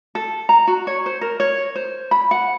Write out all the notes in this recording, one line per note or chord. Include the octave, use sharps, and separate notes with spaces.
A4
A#5
F#4
C#5
C5
A#4
C#5
C5
B5
F#5